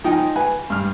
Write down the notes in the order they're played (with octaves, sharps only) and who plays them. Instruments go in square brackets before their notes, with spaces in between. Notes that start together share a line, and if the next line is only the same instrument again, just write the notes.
[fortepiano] F3 D#4 [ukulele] D#5 G5 G#5
[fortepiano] B4 [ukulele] G#5
[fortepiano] G2 F6